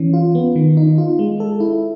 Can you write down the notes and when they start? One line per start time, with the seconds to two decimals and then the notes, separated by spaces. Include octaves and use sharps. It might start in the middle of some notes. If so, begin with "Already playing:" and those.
Already playing: E3 C#4
0.13 F4
0.35 B3
0.56 D#3
0.77 D#4
0.98 F4
1.19 G#3
1.40 A4
1.60 E4